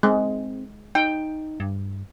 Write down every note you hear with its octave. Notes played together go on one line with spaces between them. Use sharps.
G#3 C4
D#4 G5
G2